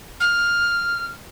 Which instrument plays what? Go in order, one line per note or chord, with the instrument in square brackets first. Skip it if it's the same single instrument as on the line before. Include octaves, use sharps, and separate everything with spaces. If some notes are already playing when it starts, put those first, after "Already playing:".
[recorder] F6